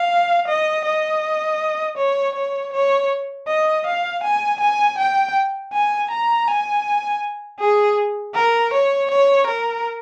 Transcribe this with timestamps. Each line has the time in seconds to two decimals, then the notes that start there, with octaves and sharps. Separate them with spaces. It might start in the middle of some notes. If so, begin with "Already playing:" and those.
Already playing: F5
0.48 D#5
0.85 D#5
1.97 C#5
2.36 C#5
2.73 C#5
3.48 D#5
3.86 F5
4.23 G#5
4.60 G#5
4.98 G5
5.72 G#5
6.10 A#5
6.48 G#5
7.60 G#4
8.35 A#4
8.73 C#5
9.11 C#5
9.47 A#4